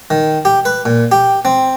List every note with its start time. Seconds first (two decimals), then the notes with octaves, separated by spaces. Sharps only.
0.10 D#3
0.45 G4
0.65 B4
0.85 A#2
1.12 G4
1.45 C4